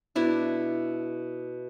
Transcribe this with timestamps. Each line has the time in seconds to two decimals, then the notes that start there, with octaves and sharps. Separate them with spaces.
0.16 B2 D4 E4 E5